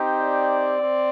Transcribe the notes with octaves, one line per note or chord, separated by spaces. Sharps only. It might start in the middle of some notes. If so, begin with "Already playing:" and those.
Already playing: C4 D#4 G4
D5
C4